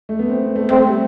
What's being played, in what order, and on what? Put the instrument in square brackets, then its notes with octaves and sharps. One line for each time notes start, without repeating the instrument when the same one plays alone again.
[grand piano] A3
B3
C4
B3
A3
[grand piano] A3 [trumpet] C4
[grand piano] G3